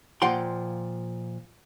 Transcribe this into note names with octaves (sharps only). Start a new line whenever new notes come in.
A#2 F3 F#5 G5 C6